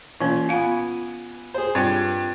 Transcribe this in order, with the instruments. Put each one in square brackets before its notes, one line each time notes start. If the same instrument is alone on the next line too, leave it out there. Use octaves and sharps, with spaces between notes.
[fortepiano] A#2 [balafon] E3 C#4
[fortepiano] B3 G#5 [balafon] F4 F5
[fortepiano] G#4 C5
[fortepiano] G2 [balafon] C4 F4 C#5